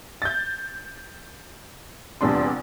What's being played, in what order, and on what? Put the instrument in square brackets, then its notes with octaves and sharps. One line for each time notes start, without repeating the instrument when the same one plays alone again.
[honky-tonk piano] G6 A6
F1 A#1 E2 G3 D4 C6